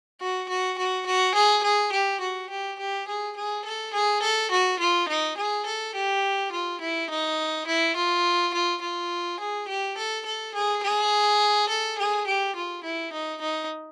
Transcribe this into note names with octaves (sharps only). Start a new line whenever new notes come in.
F#4
F#4
F#4
F#4
G#4
G#4
G4
F#4
G4
G4
G#4
G#4
A4
G#4
A4
F#4
F4
D#4
G#4
A4
G4
F4
E4
D#4
E4
F4
F4
F4
G#4
G4
A4
A4
G#4
G#4
A4
G#4
G4
F4
E4
D#4
D#4